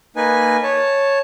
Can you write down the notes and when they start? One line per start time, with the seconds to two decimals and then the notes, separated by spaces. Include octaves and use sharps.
0.16 A#3 D#4 B4 G#5
0.63 C#5 A5